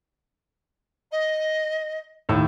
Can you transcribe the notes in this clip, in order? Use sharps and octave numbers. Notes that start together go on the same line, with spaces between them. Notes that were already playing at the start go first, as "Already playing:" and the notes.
D#5
D#2 A2 E6